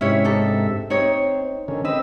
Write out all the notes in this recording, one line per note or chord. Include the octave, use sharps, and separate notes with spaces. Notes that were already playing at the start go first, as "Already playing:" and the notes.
G#2 C3 C#4 E4 C#5 E5
D4 D#4 A4
C4 D#4 C#5
D3 D#3 C#4
C4 B4 D#5 E6